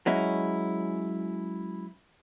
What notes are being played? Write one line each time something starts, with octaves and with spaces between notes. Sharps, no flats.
F#3 G#3 C#4 E4